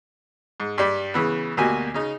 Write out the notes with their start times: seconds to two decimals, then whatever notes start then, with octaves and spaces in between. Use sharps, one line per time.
0.60 G#2
0.78 G2 G3
1.14 C#3 E3 B3
1.57 D2 B2 A#3 F#4 G4 G#5
1.94 C#3 D#4